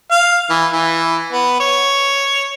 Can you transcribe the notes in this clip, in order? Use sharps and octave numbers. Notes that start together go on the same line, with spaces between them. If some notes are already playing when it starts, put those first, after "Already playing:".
F5
E3
E3
B3
C#5